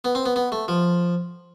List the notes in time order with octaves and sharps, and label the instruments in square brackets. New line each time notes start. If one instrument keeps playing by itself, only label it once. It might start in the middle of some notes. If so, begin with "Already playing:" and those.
[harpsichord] B3
C4
B3
B3
A3
F3